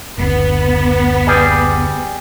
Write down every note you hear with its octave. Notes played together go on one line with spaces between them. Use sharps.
F#1 D2 B3
G3 G#4